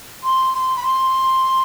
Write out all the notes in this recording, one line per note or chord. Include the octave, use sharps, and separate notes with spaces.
C6
C6
B5
C6